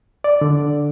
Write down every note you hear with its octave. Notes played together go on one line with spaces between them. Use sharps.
D5
D3